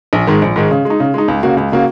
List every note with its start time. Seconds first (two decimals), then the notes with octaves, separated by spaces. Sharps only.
0.13 A#1
0.27 G#2 D#3 G#3
0.42 A#1
0.56 G#2 D#3 G#3
0.71 C#3
0.85 G#3
0.90 D#4
1.00 C#3
1.14 G#3 D#4
1.28 C#2
1.43 C#3 A#3 F#4
1.57 C#2
1.72 C#3 A#3 F#4